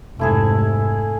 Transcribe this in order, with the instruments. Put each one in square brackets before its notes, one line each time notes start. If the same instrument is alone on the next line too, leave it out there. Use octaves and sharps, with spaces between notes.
[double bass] F1 G#2 [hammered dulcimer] A3 E4 G#4